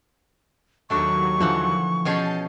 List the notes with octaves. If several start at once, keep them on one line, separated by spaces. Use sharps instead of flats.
D#2 F#3 A3 D4 C#6
D3 E3 F3 F#5
B2 C#4 G#4 A5 G6